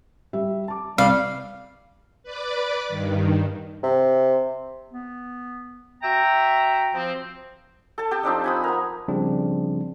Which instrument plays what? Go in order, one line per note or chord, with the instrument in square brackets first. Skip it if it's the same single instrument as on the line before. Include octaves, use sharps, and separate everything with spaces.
[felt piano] G3 E5
A5 D6
[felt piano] C2 [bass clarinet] G3 [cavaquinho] F5
[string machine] B4 D5 D6
G2 D#3
[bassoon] C3
[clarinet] B3
[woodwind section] F#4 E5 A#5 [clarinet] G5
[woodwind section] F3 C4
[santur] A4 A5
G4 G5 A5 D#6
F3 C4 D4 D#4
G#5 B5 D#6
B3 A#4
[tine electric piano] C#3 F3 G3 C4 D4